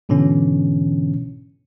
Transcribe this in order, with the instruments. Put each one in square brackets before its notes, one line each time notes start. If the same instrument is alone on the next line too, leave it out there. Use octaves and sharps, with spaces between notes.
[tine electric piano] G#2 B2 D3 E3 C#4